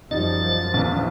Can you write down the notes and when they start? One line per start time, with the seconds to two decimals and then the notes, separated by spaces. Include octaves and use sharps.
0.11 F#2 F3 G3 D#4 A6
0.74 A#1 E2